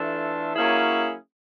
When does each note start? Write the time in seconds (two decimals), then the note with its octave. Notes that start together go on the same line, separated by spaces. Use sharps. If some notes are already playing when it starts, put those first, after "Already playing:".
Already playing: E3 A3 D4 F4 A4
0.54 F#3 A#3 C#4 E4 G#4